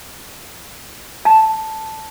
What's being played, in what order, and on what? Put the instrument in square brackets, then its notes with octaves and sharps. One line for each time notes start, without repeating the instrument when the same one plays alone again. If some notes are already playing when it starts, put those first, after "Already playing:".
[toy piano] A5